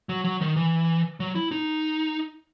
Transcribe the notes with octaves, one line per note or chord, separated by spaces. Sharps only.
F#3
F#3
D#3
E3
F#3
E4
D#4